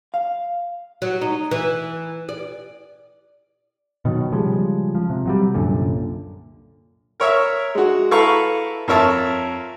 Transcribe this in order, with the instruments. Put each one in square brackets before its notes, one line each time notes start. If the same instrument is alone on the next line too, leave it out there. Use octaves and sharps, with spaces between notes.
[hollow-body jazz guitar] F5
[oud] F#3
D#4
E3
D5
[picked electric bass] B2 D#3 F#3
C#3 F3 G3 G#3
F3
C3
C3 F#3 G3
C2 F#2 A#2 D3
[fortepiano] A#4 C#5 E5
G#3 F#4
E4 A4 B4 F5 A#5 C#6
F2 A#4 C#5 E5 A5